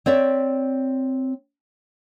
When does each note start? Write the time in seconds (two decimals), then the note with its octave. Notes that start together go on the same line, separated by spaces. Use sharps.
0.06 C4 C#5 D5 E5